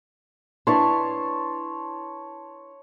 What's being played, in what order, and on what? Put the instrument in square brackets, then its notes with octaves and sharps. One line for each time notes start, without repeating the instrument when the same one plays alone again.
[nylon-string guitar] D4 E4 B4 [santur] C#5 A5 C6